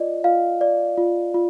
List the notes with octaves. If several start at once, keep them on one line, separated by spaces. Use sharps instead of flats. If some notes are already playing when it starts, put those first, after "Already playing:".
Already playing: F4 D5 D#5
F4 F5
D5
F4
F4